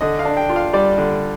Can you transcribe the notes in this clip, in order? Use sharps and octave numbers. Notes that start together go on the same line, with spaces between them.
D3 D#5
F5
D4
G5
F4
F5
G3 D5
D3